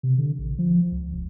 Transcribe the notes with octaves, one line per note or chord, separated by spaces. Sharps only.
C3
D3
A1
F3
C#2
D#1